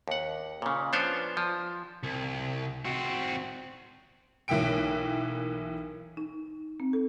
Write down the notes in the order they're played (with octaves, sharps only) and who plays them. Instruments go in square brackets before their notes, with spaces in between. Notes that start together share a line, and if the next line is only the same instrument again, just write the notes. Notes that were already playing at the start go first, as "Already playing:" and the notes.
[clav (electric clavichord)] D#2 F#5
A#2 C#3
F3 B3 D4 C5 C#5
F3
[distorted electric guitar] C2
C4 F#4
[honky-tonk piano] B1 E3 A#3 E5 G5 D7
[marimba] D#4
C4
A4